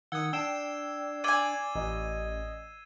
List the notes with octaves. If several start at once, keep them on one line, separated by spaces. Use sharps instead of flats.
D#3 F#5 D#6 E6 G#6
D4 G5 E6 C7 E7
D5 G#5 E6 G#6 D#7
A1 D#5